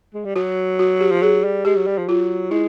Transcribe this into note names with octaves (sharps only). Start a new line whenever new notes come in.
G#3
G3
F#3 F#4
F#4
G4
F3
F#3 G#4
G3
G#3 G4
F#3
G3
F3
F#3 F4
G#3 E4